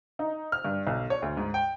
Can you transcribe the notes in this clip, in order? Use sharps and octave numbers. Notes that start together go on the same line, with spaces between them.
D#4
F6
G2
B1
C#5
D2
G#2
G5